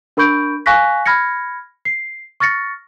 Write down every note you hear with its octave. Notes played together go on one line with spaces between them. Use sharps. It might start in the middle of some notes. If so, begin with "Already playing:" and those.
D4 A#4 B5 C#6 G6 D7
F5 G#5 C#6 F#6 A#6 B6
B5 F6 G#6 A#6 C#7
C7
C#6 F6 A6 A#6 C#7